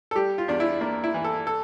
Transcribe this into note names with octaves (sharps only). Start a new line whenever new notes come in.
A4
G3 G4
F4
E2 D4
E4
A#3 D4
E4
E3
A4
A4